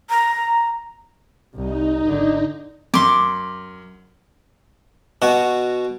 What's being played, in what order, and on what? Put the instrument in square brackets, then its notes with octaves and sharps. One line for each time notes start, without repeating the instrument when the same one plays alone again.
[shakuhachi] A#5
[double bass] C2 [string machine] D#4
[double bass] G#1 D3
[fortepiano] F#2 [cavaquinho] C6 D6
[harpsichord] B2 F#4